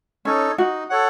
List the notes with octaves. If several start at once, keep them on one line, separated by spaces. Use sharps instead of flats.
C#4 D#4 A4 C#5
D#4 F#4
A4 C#5 F#5